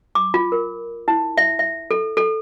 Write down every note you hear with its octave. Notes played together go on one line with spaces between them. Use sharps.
D6
F4
A#4
E4
E5
E5
A4
A4